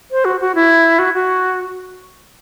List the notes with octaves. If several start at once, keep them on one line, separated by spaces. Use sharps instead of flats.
C5
F#4
F#4
E4
F#4
F#4